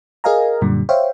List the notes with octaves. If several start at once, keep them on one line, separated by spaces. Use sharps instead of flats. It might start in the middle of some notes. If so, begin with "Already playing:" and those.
G#4 A#4 D#5 F5 G#5 A#5
F#2 A#2 D3 G3
C5 C#5 E5 F5 G5